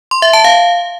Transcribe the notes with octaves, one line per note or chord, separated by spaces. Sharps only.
C6
E5
A5
F5